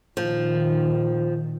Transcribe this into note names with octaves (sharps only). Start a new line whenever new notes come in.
A#2 D#3 F3